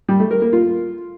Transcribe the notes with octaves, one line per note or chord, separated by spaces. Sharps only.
G3
A3
A#4
A#3
F4